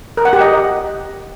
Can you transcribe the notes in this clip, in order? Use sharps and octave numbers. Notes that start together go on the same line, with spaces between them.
A#4
F#5
G4
D#5